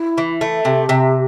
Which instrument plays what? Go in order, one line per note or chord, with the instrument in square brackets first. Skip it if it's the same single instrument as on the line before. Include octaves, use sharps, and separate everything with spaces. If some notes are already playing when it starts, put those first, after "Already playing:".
Already playing: [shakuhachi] E4
[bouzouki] E3
A3
[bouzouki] C3 [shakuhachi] G4
[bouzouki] C3